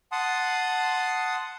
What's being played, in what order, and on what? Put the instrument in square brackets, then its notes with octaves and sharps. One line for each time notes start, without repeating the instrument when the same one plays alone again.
[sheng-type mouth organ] F#5 A5 C6 D#6